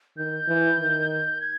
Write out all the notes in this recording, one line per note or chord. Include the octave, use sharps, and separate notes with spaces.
D#3 G6
E3
D#3
G#6